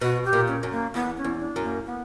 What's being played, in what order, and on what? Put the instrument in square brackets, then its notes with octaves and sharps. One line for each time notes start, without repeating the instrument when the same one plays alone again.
[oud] B2 [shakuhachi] F#4
[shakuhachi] G4
[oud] A#2
[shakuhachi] C#4
[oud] F#2
[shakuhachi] A#3
[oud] E2 [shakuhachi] B3
[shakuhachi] C#4
[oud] E2
[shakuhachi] D4
[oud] F#2
[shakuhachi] A#3
B3